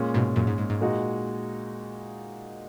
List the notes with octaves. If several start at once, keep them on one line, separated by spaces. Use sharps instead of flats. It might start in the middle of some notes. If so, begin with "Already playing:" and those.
Already playing: A#2 G#3 C#4
G#2 B2
F#2 A#2
G#2
G#2
G#2
A#2 G#3 D#4 F#4